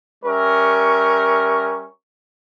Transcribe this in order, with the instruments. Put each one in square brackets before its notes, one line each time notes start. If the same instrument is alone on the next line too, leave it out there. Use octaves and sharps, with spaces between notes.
[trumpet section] G3 C#4 A#4 E5 C#6